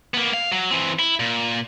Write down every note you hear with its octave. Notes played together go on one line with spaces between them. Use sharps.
A#3 B3
F5
F#3
E3 C4
E4
A#2